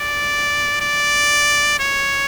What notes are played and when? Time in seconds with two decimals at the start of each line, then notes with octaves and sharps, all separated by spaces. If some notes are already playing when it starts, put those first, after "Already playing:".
Already playing: D5
0.81 D5
1.80 C#5